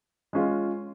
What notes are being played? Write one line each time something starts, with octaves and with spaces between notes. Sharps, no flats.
G#3 C#4 F4